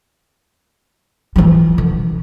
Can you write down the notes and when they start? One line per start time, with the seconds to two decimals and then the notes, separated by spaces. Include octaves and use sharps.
1.36 E3 F3
1.78 D3